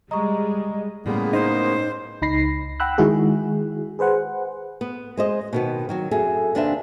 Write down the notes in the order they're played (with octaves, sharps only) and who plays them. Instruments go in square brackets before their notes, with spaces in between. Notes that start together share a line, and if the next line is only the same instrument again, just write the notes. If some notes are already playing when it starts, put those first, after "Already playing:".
[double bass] G3 [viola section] G#3 [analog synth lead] D#5 [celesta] A#5 C#6
[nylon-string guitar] A2 G3 G#3 [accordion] C#3 A#3 B3
[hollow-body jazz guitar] D#4 [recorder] C5
[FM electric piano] C#2 D#4 B5 A#6 C7
F#5 G5 B5 E6 F#6
D#3 G#3 E4 F#4 G#4
G#4 B4 C5 F#5
[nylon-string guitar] B3
G#3 C5 D#5
B2 D#3 B3
D#3 F#3 F#4
F#2 G#4 A4 E5 A5
D#2 C3 D4 B4 C5 E5